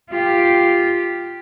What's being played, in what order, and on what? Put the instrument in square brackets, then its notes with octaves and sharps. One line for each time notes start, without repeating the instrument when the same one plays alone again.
[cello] F4 G4